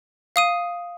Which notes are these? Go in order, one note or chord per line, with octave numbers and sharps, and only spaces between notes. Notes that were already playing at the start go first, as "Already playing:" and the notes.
F5 D#6 D#7